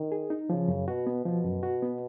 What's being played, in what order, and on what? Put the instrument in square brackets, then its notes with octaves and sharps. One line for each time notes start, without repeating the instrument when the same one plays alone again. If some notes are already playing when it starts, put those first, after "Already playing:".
Already playing: [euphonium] D#3
[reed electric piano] G#4
D#4
[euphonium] C#3 [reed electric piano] F3
[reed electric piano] F#2
[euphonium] B2 [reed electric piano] F#4
[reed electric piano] B3
[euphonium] B2 [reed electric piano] F3
[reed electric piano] F#2
F#4
B3